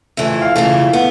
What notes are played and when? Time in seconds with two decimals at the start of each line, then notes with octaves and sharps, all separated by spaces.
0.17 F2 C#3 E3 A3 E5
0.42 F5
0.56 F2 C#3 E3 A3 F5
0.93 B3